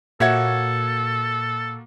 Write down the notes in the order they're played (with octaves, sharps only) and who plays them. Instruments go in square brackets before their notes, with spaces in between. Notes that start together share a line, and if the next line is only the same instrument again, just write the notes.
[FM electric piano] A#2 [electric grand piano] A#3 F#4 G#6 [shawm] A4 [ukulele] C#5 E5 F#5